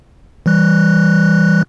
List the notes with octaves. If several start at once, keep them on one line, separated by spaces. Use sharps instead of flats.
E3 G3 F#6